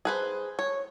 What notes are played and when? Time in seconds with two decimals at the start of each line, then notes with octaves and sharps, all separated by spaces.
0.05 G#4 B4 C5
0.59 C#5